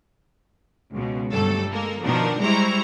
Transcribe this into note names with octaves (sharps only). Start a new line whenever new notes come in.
C#2 B2
G1 F#3 G3 A3 A4
G#3 A#3 A4 A#4
B2 D#3 F3 D4 D#4 A#4
G3 G#3 E4 C5 A#5 C#6